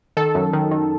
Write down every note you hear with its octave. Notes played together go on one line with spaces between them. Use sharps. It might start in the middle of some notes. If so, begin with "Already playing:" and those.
D#3 A4
F#2
D#3
D#3